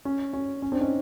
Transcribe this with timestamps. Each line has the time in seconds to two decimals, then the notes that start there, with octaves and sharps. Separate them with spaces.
0.05 C#4
0.33 C#4
0.62 C#4
0.72 C4 D4
0.81 C#4 D#4